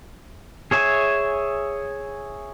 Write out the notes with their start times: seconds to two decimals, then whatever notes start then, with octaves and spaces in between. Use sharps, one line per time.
0.71 G#4 C#5 E5 G#5